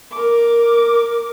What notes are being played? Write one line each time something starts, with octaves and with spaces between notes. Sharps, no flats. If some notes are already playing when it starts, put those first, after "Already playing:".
A#4 D6